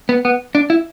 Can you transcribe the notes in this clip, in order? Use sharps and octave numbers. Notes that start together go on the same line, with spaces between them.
B3
B3
D4
E4